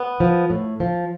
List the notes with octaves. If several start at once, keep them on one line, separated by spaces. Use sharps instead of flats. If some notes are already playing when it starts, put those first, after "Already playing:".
Already playing: B3
F3
A2
F3